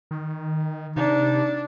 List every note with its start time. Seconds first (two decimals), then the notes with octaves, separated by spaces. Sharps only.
0.11 D#3
0.96 C3 D4 D#4